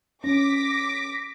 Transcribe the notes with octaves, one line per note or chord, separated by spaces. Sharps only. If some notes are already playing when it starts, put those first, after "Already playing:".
C#4 D6 A#6 B6